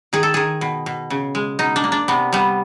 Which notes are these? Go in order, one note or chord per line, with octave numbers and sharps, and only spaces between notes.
D#3 G#4
A4
D#3 G#4
B2
B2
C#3
G#3
B2 D#4
D4
A#3
D4
C3 B3
G3 B3